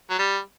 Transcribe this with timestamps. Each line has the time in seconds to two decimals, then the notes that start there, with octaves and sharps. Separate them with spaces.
0.10 F#3
0.19 G3